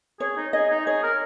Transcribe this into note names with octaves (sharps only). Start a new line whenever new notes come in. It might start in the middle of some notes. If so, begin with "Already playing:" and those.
G#4 C#5
D#4
G#4 D#5
D#4
G#4 C#5
A#4